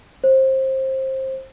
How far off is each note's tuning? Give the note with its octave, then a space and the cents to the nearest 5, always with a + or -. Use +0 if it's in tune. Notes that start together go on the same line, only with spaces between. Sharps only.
C5 +20